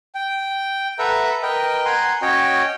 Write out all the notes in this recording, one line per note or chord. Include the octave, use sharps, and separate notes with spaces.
G5
A4 B4 E5 F#5 A#5
A#4 B4 D#5 G5
F#5 G#5 A#5 C6
C#4 F#4 C#5 D#5 G5